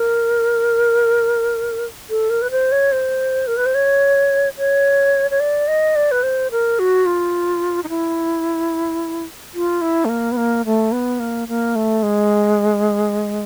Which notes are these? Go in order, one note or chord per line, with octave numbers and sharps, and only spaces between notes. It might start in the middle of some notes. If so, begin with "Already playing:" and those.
Already playing: A#4
A4
A#4
B4
C5
C#5
C5
A#4
B4
C5
C#5
C#5
C#5
D5
D#5
D5
B4
C5
A#4
F#4
F4
D#4
E4
F4
E4
A3
A#3
B3
A#3
A3
B3
A#3
A#3
A3
G#3